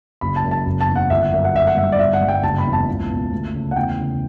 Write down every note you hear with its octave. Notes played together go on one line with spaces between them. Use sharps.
F#1 B5
A5
F#2
A5
F#1
A5
E2
F#5
G1 E5
F#5
F#2 E5
F#5
G1 E5
F#5
G2 E5
D5
G1 E5
F#5
G2
G5
F#1 A5
B5
E2
A5
C#2
B2
D2
C#3
F#5
E2 G5
C#3